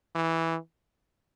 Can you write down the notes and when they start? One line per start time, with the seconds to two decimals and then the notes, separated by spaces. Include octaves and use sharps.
0.15 E3